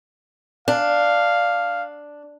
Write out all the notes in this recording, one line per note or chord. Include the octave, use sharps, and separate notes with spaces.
D4 F5